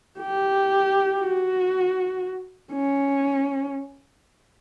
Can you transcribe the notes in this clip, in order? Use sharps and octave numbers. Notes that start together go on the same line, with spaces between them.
G4
F#4
C#4